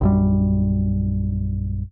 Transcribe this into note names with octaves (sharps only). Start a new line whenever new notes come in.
A#1 F#2 G3